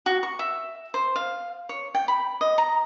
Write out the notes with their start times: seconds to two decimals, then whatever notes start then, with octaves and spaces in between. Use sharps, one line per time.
0.06 F#4
0.23 C#6
0.39 E5
0.94 C5
1.16 F5
1.69 C#5
1.95 G5
2.08 B5
2.41 D#5
2.58 A#5